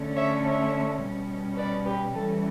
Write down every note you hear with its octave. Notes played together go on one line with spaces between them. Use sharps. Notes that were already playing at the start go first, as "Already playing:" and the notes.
Already playing: D3 A3 C#4
C#5 E5
C#5 E5
B2 G3 C#4
B4 D5
G4 B4
E3 G3 C#4 A4